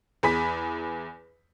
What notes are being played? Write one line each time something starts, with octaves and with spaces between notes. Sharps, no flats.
E2 G#4 B5 B6